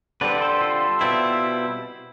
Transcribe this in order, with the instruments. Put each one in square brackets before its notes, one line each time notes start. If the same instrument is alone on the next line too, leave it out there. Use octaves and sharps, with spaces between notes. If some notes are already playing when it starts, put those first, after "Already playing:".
[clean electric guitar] D3 G3 C4 [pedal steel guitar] B4 D5
[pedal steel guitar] A4 C5
F4 A4
[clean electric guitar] B2 G3 C4 E4